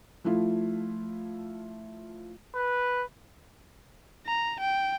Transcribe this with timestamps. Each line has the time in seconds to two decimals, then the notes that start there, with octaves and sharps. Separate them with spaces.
0.24 F3 A3 E4 F4
2.55 B4
4.26 A#5
4.60 G5